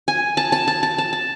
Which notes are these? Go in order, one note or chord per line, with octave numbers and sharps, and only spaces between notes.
G#5
A5
A5
A5
A5
A5
A5